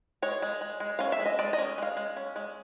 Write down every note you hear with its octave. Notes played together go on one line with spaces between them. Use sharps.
G#3 C#5
G#3
G#3
G#3
C#4 F5
E5
G#3
D#5
G#3 D5
D#5
C#4
G#3 F5
G#3
C#4
G#3